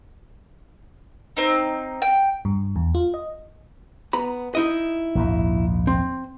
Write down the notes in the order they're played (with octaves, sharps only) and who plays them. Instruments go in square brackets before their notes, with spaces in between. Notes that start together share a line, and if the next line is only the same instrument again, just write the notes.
[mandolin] C4 D#4
G5
[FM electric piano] G2
E2
F4
D#5
[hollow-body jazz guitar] B3 A#5 B5
D#4 E4 D#5
[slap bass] A#1 D#2 G#2
[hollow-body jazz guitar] C4